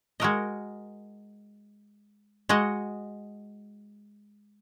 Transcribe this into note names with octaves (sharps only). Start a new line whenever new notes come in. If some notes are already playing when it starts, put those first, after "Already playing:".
G#3 F#4 A#4 D#5
G#3 F#4 D#5